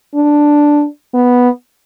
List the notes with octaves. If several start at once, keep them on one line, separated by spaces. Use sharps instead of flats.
D4
B3